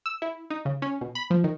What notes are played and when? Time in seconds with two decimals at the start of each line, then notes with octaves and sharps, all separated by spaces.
0.06 E6
0.22 E4
0.50 D#4
0.65 C#3
0.82 C#4
1.01 B2
1.15 B5
1.30 F3
1.44 D#3